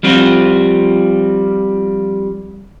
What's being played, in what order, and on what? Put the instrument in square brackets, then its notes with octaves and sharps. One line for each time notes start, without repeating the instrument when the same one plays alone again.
[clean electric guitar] F3 G3 C4 F4 F#4